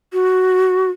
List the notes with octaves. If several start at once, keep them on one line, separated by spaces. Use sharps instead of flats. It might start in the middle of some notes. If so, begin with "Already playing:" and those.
F#4